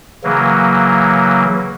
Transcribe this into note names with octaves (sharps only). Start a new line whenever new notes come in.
C#3 E3 F#3 A#3